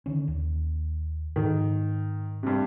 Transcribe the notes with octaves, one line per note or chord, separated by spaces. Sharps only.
D3 D#3 C#4
D#2
G#2 D#3
G2 C3